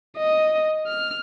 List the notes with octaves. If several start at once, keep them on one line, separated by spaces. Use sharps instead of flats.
D#5
F6